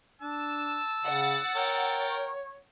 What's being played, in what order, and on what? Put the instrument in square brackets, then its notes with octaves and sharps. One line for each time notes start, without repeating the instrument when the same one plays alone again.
[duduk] D4 [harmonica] A5 [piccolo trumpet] E6
[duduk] C#3 [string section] F#5 A6
[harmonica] A#4 G5 [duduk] C#5